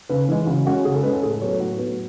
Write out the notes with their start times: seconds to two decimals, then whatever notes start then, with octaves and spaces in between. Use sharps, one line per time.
0.09 C#3 B4
0.29 E3 G#3
0.47 C#3 F#4
0.66 G#3 C#4 F#4
0.85 C#3 G#4
0.94 A4
1.03 G#3 C#4 B4
1.13 A4
1.23 A2 G#4
1.32 A4
1.41 F#3 B3 C#5
1.51 A4
1.60 A2 F#4
1.79 F#3 B3